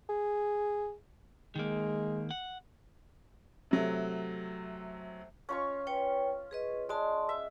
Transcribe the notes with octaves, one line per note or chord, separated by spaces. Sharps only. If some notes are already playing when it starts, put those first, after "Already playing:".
G#4
D#3 G#3 A#3
F#5
C3 F#3 A3
C#4 F4 C#6
B4 C#5 G5
G#4 B4 D#5
G#3 D5 A5 C6
E5